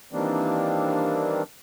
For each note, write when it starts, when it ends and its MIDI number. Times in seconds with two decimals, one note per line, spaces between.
0.13 1.43 51
0.13 1.43 52
0.13 1.43 55
0.13 1.43 58
0.13 1.43 60
0.13 1.43 62